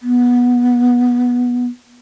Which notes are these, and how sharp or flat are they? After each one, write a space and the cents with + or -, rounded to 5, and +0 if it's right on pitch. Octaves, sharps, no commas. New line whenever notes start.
B3 -15